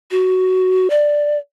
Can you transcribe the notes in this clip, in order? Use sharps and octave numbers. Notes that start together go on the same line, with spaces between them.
F#4
D5